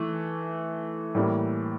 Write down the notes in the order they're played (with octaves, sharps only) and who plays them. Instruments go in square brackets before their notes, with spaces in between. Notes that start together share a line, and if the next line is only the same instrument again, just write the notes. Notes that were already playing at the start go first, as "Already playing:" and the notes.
Already playing: [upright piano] E3 A3
A2 E3 G3 A#3